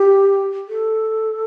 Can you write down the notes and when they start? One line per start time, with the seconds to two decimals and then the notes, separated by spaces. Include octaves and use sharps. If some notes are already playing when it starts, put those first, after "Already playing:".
Already playing: G4
0.68 A4